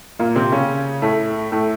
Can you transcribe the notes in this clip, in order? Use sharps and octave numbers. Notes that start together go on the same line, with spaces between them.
A#2 A#3
C3 C4
C#3 C#4
A2 A3
A2 A3